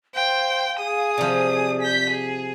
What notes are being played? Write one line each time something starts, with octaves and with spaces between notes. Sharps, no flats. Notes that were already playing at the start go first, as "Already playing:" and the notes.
C5 F5 G5
G#4 D#6
C3 F3 D5
G6 B6
G#4